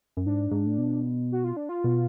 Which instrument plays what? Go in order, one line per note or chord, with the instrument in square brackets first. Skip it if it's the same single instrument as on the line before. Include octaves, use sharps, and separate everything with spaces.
[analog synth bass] F#2
[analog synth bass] G#2 [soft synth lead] D4
[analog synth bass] G#2
A2
B2
[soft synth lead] F#4
F4
D4
F4
[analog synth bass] B2